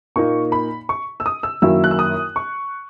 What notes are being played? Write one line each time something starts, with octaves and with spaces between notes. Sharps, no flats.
A#2 A#3 D#4 C#6
B5
C#6
E6
D#6
E6
F#2 D#3 F#3 A#3 E4 E6
F#6
E6
D#6
C#6